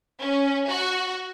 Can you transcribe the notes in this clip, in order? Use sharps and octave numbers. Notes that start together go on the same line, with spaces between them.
C#4
F#4